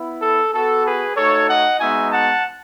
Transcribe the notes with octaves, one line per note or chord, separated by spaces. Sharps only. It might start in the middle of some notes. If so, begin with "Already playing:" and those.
Already playing: B3 E4
A4
B3 F#4 A4
G#4 B4
A3 D#4 F#4 A4 C#5
D#5 F#5
G#3 B3 D#4 F#4 E5 G#5
F#5 A5